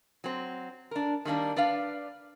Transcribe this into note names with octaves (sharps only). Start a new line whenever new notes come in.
F#3 C4
D4 A#4
D#3 G3 A#3 D4
D4 B4 D5 F5